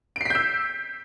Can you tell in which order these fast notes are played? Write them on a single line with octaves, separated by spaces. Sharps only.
D7 C7 B6 G6 E6